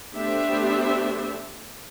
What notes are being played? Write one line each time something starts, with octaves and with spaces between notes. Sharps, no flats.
A3 B3 D4 G4 C5 E5